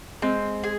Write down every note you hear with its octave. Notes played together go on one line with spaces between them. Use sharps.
G#3 C4
G#4